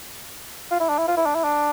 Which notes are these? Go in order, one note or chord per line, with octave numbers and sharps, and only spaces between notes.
F4
E4
D4
E4
F4
E4
D4
E4
D4